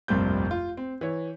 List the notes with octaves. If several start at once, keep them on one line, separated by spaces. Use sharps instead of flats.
F1 C2 G2 A#2 C4 G6
F4
C4
E3 C#5